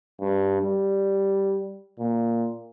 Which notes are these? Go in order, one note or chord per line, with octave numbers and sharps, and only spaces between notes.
G2
G3
A#2